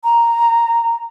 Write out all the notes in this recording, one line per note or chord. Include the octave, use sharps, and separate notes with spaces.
A#5